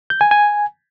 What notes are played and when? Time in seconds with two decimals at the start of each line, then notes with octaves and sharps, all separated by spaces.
0.10 G6
0.21 G#5
0.31 G#5